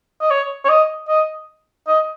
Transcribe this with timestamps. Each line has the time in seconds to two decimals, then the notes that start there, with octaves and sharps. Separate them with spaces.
0.21 D#5
0.31 C#5
0.65 C#5
0.69 D#5
1.09 D#5
1.88 D#5